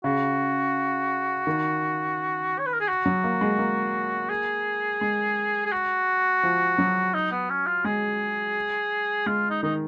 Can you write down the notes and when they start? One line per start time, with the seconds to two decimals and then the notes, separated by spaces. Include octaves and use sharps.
0.04 C#3 F#4
1.47 D#3
2.59 C#5
2.66 B4
2.73 A#4
2.80 G#4
2.88 F#4
3.06 F#3
3.24 A#3
3.41 G#3
3.59 A#3
4.30 G#4
5.01 G#3
5.66 G#4
5.72 F#4
6.43 F3
6.78 F#3
7.14 D#4
7.32 B3
7.50 C#4
7.67 F4
7.84 G#3 G#4
9.26 G#3 F4
9.50 D#4
9.63 D#3 D#4